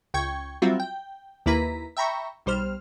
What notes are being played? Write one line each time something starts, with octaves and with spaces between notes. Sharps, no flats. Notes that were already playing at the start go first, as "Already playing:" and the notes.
C#2 G5 C#6 G#6
F#3 G3 C4 F4 F#4 E5
G5
D#2 A#3 E4 B4 A#5 B6
E5 G5 A#5 B5 C#6
B1 G3 C5 F6